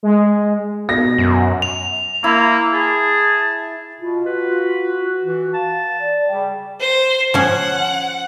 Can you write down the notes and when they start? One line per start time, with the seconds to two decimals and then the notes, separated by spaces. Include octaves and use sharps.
0.03 G#3
0.89 B2 A#6
1.18 F#2
1.62 F7
2.24 A#3 E4 E6
2.73 G#4 A5
4.01 B2 F4
4.26 F#4 B4
5.23 E3
5.54 F5 A5
6.00 D5
6.28 C#3 G3 G5
6.81 C5
7.34 F3 C#4 F#5